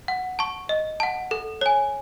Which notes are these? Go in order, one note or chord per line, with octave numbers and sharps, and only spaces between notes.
F#5
A5 C#6
D#5
F#5 A5
A4
C#5 G#5